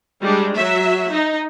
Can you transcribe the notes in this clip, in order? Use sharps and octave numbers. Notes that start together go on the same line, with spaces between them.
G3 G#3 D4
F#3 E5
D#4